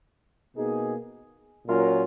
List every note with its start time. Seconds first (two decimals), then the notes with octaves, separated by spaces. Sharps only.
0.57 B2 A#3 D#4 G#4
1.66 A#2 F#3 C#4 F4 A#4